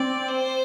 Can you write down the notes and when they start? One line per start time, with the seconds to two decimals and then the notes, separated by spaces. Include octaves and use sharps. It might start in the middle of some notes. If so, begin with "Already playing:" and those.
Already playing: C4 D5
0.29 C5